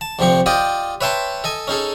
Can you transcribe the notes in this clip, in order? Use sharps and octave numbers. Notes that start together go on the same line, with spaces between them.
A5
D2 C3 F3 G4 C#6
F4 G4 D5 D#5 G5 D#6
B4 C#5 E5 G5 A5 C6
A4 D#5 G#5
C#4 D#4 G#4 A4